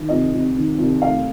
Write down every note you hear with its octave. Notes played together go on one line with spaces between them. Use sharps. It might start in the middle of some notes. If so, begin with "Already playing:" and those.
Already playing: D#3
C2 D#5
C2
D#3
C2
A3 F5